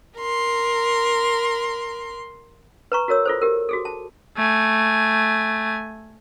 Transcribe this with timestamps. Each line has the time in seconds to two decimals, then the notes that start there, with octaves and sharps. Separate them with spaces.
0.18 A#4 C6
2.92 B4 A#5 C#6
3.08 F#4 A#4 C#5 E6
3.25 F4 A4 C5
3.41 G4 A#4
3.69 F#4 G#4 A4
3.85 A5
4.37 A3 G#5